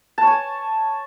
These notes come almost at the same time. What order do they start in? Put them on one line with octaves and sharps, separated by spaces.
A5 C#5 G#5